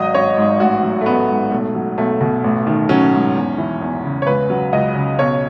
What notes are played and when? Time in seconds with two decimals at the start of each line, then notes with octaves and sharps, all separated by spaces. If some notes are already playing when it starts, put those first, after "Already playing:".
Already playing: G#1 F#3 D#5
0.14 G#1 C#5
0.37 G#2
0.60 A1 F#4
0.83 F#3
1.01 A3
1.06 A1 B3
1.29 G#2
1.52 B1 A3
1.75 F#3
1.98 B1 A3
2.21 B2
2.44 A1
2.67 D#3
2.89 F#3 C#4
3.13 G#2
3.35 E2
3.58 E3
3.81 E2
4.04 C#3
4.22 C#5
4.26 C#2 B4
4.50 F#3
4.73 C#2 D#5
4.95 C#3
5.19 B1 C#5